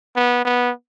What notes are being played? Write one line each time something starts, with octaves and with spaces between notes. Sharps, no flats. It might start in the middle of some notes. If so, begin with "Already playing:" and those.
B3
B3